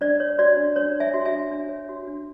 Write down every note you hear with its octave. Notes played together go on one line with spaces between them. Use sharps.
D4 D5
C#5
F#4 D5
D4
D4 C#5
C#5
E5 G#5
F#4
E5 G#5
D4
D4
C#5
F#4
D4